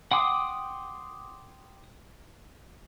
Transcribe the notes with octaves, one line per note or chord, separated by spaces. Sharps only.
F#5 G5 C6 D6 D#6